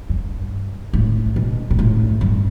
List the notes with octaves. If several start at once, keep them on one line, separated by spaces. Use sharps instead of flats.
G2
A2
B2
B2
A2
G2